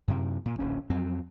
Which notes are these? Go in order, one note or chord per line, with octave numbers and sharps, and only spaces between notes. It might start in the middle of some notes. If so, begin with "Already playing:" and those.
F#2 C3
A#2
D1 A#1 C#4
F2 F#3 C4